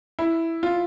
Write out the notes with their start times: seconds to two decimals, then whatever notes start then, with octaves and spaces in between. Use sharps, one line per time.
0.19 E4
0.63 F4